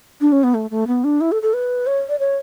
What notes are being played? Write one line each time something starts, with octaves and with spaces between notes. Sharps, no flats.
D4
C#4
B3
A3
A3
B3
D4
E4
A4
A4
B4
C#5
D5
C#5